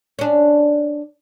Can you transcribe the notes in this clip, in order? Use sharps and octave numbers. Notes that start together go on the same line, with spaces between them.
C#4 D4